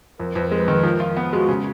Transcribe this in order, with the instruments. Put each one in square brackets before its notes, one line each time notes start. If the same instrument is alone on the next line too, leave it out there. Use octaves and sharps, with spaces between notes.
[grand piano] F2 [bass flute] A#4
[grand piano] F2 [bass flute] B4
[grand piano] G#3 [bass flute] A#4
[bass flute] B4
[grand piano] D#3
[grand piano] F3 [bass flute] A#4
[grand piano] F4
B3
[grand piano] G#3 [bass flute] F#4
[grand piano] C#3